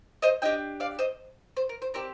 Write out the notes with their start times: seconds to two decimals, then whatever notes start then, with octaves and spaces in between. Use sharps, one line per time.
0.22 C5 D#5
0.42 D4 G4 D#5 G5
0.80 D5 F5
0.99 C5 D#5
1.57 C5
1.69 A#4
1.82 C5
1.94 C4 G4 A#4 D5